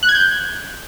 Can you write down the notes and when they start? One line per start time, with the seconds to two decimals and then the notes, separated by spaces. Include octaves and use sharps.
0.03 F#6
0.09 G#6
0.15 G6